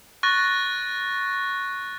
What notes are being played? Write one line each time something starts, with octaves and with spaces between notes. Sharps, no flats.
C#6 F#6 A6 A#6